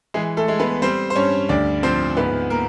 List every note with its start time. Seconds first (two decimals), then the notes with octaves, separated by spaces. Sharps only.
0.14 E3 G#3 G#4
0.37 A3 A4
0.48 G#3
0.59 B3 B4
0.82 G3 C4 C5
1.10 C5
1.15 G2 C#4 C#5
1.49 D2 D4 D5
1.83 F3 C4 C5
2.17 G#2 B3 B4
2.50 A#3 A#4